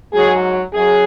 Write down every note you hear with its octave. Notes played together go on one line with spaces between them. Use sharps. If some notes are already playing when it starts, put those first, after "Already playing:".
G#2 F#3 G#4
F#2 F#3 G#4